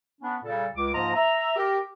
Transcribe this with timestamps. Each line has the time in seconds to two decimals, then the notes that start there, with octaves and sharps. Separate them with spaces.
0.21 B3 C#4 D4
0.43 A#2 C#3 G3 A4
0.76 C#2 D6
0.94 G#2 F3 A#3 F4 D#5 A#5
1.15 E5 A#5
1.57 G4 A#4